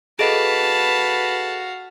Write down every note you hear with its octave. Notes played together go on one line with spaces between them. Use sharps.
F#4 G#4 A4 B4 D#5 F5 A5